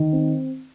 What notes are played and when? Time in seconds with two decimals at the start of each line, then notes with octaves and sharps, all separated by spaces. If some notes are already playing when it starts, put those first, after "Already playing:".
Already playing: D#3
0.13 C4